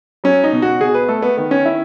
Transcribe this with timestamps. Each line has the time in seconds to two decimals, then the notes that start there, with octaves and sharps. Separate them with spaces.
0.24 F#3 C#4
0.44 D#4
0.52 B2
0.62 F#4
0.80 B2 G#4
0.95 B4
1.08 A3 A4
1.22 B3
1.37 D#3 B3
1.51 C#4
1.65 E4